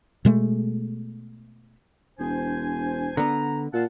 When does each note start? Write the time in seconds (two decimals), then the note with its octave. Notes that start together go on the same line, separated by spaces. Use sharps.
0.25 B2 G#3 A3
2.19 E1 D4 C5 G#5
3.17 D3 B3 A#5
3.74 A#2 F5 F#5 A5